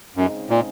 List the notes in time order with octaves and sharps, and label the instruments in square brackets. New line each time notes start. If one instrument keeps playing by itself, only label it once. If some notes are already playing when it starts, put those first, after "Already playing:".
[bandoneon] F#2 [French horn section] C#3 G#3 C4 D#4
[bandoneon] A#2